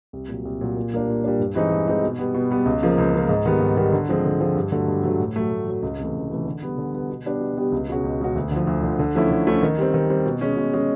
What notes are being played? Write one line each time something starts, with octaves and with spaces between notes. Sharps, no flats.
C2
A#2 F#3
C2
A#2 F#3
A#2
G3 A#3 D4
A#2
G3 A#3 D4
G2
E3 G#3 C4 D#4
G2
E3 G#3 C4 D#4
B2
G3 B3
B2
G3 B3
C#2
C#3 F3 A#3
C#2
C#3 F3 A#3
G#2
D#3 G3 B3
G#2
D#3 G3 B3
D3
F3 G#3 C4
D3
F3 G#3 C4
G2
D3 F#3 A3
G2
D3 F#3 A3
A2
F#3 A3
A2
F#3 A3
C#2
C3 E3 A3
C#2
C3 E3 A3
D3
G3 B3
D3
G3 B3
B2
G3 B3 D4 G4
B2
G3 B3 D4 G4
C#2
B2 G#3 C#4 F#4
C#2
B2 G#3 C#4 F#4
D2
D3 F3
D2
D3 F3
D3
F3 A3 C#4 E4
D3
F3 A3 C#4 E4
D#3
G3 C4
D#3
G3 C4
B2
G#3 C#4
B2
G#3 C#4